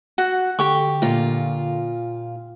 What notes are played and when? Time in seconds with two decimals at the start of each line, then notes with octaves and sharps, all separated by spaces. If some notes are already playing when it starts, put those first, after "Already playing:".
0.18 F#4 F#5
0.59 D3 G4 G5 C#6
1.02 A#2 F4